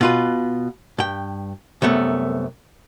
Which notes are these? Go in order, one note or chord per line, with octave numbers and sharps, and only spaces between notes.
B2 F4 B4
G2 G5
C2 F#2 A3 B3